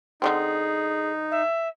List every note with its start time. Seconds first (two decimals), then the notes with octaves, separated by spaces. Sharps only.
0.22 D3 D#3 C4 D#4 G#4
1.31 E5